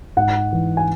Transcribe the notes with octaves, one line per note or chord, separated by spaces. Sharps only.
G#2 F#5
E3
G#5